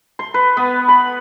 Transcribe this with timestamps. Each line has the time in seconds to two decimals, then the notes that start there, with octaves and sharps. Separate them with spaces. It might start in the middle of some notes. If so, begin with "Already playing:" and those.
0.19 C6
0.34 B4
0.57 B3
0.88 B5